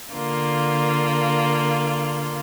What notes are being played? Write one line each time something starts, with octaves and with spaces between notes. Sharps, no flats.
D3 A#3 F4